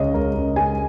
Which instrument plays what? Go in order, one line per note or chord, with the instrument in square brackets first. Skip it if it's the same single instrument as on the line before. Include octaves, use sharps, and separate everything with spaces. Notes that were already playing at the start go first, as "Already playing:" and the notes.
Already playing: [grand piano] C#2 G#3 C#5 D#5
C#2 A#4
C#2
G#3 G#5